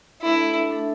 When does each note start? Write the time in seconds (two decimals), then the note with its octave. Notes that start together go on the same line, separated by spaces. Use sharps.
0.22 A3 D4 E4 A4 E5
0.70 A3 D4 A4 E5